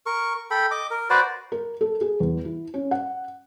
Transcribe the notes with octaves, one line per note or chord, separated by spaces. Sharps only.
A#4 C#6
A4 G5 B5
D#5 D6
A#4
F#4 B4 C5 D5
A#4
A4
G#4
E2
E4
C#4
F#5